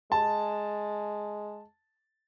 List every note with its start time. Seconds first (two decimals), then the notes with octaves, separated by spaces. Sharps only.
0.12 G#3 A5